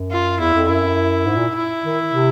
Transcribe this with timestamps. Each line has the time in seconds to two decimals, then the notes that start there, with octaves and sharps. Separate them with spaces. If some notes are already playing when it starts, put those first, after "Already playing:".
Already playing: F#2
0.11 F4
0.40 E2 E4
0.54 F2
0.69 F#2 E4
1.26 G#2
1.36 A#2
1.55 E4
1.84 D#3
2.13 C3